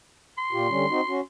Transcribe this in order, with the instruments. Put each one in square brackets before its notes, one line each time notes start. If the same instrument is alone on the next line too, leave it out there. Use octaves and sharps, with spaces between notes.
[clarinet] C6
[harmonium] A#2 F4 G4
D3 G3 C#4
C4 D#4 F#4
C#4 F#4